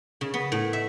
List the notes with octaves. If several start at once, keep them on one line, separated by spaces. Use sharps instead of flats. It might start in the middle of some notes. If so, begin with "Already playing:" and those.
C#3
B3
A2
E5